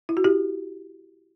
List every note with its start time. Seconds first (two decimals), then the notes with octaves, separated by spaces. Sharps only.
0.09 E4
0.17 F#4
0.24 E4 G4